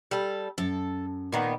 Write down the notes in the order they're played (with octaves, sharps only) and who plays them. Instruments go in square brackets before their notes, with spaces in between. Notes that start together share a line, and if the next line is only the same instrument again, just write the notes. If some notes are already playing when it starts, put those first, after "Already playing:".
[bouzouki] G3 A4
[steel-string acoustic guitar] F#2 [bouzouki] A4
[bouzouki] A#2 D#3 B3